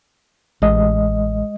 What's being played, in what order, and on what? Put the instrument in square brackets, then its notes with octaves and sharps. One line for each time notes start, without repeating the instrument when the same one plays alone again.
[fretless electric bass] A1 [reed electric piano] G#3 D#5